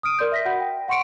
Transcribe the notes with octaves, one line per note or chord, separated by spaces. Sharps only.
D#6 F6 D7 D#7
A#4 D5 C6 G6
E5 A#6 B6
F#4 F#5 B5 G6
G5
F#5 C6 C#6 C#7 D7